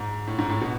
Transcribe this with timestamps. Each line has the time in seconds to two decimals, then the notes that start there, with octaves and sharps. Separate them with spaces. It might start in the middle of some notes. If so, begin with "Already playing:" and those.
Already playing: G#2
0.27 A2
0.38 G#2
0.49 A2
0.61 B2